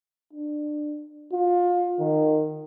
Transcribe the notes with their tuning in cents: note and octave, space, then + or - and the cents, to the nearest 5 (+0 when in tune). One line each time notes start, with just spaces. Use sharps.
D4 +20
F4 +25
D#3 -15